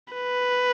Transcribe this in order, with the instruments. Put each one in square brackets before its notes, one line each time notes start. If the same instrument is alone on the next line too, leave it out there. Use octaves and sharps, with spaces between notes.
[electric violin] B4